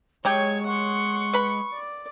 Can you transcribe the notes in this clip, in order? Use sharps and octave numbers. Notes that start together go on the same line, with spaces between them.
F#3 G#3 G4 C#5 G5 C#6 G#6
F#5 C6 C#6
B4 B5
D5